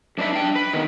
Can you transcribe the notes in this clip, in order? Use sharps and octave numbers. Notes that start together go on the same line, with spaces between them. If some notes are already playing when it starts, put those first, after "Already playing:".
F#2 D4 D#4 B4 E5
D4 G5
B4
D#3 B3